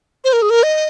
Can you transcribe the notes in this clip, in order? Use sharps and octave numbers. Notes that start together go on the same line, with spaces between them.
C5
A#4
G#4
A#4
D#5